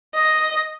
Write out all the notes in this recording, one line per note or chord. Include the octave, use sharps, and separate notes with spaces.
D#5